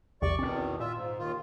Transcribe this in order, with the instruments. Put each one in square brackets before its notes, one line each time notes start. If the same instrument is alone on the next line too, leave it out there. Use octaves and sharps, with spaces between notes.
[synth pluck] A#1 E2 C3 [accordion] D5 C#6
[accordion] E2 B2 D#3 [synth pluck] C4 C#4
[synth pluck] A#2 [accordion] F4 E5
[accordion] G#2
D#2 D#3 F4